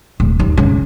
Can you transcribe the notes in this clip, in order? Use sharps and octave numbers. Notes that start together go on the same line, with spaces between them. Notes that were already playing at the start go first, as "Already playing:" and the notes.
D1
D#2
C#3